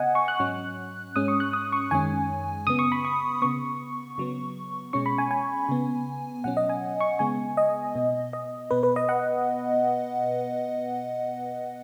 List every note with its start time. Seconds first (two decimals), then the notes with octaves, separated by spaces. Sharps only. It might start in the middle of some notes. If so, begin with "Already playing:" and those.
Already playing: C#3 B3 D#5 F#5 G#5
0.15 C#6
0.28 F#6
0.40 G#2 F#3 C#4
1.16 G#2 G#3 C#4 D#6
1.28 C#6
1.40 F#6
1.53 D#6
1.72 C#6
1.91 F#2 D#3 G#3 C#4 G#5
2.67 C#3 B3 D#6
2.79 C#6
2.92 B5
3.05 C#6
3.42 C#3 B3 C#6
4.18 C#3 F#3 B3
4.93 B2 G#3 C#4 C#6
5.06 B5
5.18 G#5
5.31 G#5
5.69 C#3 B3
6.44 B2 F#3 C#4 F#5
6.57 D#5
6.69 G#5
7.01 C#6
7.19 C#3 G#3 B3 G#5
7.57 D#5
7.95 B2 B3
8.33 D#5
8.71 B2 B3 B4
8.83 B4
8.96 D#5
9.09 F#5